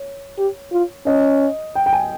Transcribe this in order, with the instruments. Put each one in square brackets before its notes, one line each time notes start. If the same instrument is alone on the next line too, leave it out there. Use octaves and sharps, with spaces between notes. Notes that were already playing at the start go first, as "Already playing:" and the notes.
Already playing: [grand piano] C#5
[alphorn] G4
F4
[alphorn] C#4 [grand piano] D#5
[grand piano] G5
G5
G#5